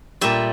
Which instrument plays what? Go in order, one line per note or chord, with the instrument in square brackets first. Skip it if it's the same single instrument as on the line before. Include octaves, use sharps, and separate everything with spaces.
[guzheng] A#2 G3 E5